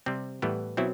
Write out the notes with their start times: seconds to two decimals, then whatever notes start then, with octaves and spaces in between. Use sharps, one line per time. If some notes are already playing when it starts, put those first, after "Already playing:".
0.06 C3 G3 C4
0.42 A2 E3 G3 B3
0.77 B2 F#3 C4 E4